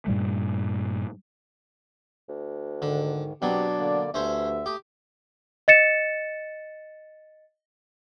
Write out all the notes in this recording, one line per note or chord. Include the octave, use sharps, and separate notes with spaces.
G2 A#2 G3 A3
D2
G#2 D3 D#3
B2 F#3 C4 D4 G4
D3 A#3 D5
D2 G2 D3 C#4 C5 E5
A3 G4 D#6
D#5 A6 C#7 E7